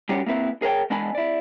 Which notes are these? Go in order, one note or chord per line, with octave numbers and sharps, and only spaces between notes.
G3 C#4 D4 F#4 G4 C#5
A#3 C4 E4 B4
G#4 A#4 C#5 E5 G5
E2 G#3 B3 D4 G#5 B5
E4 D5